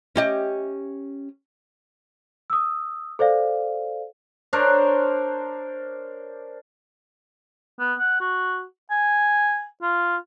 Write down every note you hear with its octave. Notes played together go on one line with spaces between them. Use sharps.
C#4 G4 D#5
D#6 E6
A4 C5 D5 F5
D4 A#4 C5 C#5
B3
F#5
F#4
G#5
F4